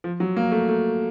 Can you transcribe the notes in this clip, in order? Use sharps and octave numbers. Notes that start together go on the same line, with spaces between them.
F3
F#3
A#3
A3
A3